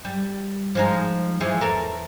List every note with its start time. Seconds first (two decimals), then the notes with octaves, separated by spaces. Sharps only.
0.05 G3
0.75 F3 G#3 D#4
1.40 E3 F3 G#3
1.61 E2 A4 A#4